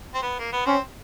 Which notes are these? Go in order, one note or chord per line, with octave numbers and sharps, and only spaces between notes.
C4
B3
A#3
B3
C4 C#4